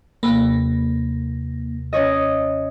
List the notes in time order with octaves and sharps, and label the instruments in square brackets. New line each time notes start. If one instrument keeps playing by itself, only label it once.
[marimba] D#2 C3 B5 [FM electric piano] A#3
[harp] C#4 C#5 D#5